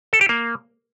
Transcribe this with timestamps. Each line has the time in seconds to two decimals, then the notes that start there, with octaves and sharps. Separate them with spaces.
0.13 A4
0.21 G4
0.29 A#3